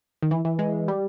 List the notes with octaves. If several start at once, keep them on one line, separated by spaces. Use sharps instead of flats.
D#3
E3
E3
G#3
G3